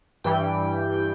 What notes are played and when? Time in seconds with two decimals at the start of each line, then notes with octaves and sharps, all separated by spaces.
0.24 G2 E3 G3 G5